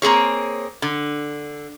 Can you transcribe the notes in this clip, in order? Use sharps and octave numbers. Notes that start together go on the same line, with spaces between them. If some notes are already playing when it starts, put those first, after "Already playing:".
A#3 C4 G#4 C#5
D3